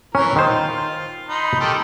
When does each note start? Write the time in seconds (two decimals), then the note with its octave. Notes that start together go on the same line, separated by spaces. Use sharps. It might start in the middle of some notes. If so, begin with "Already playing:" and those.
0.15 E3 C#4 A#4
0.36 D#3 F4 C5
1.29 D#4 B5 C6
1.60 D#3 G4 A4